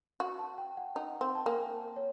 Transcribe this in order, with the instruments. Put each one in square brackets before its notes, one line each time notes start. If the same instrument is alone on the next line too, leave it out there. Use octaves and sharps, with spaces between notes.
[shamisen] F#4
[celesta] A5
G5
F#5
[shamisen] D#4 [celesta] F#5
[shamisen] C4 [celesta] G5
[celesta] A5
[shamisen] A#3 [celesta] G#5
[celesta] C#5